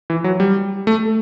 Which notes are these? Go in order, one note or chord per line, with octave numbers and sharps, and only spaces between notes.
E3
F#3
G3
A3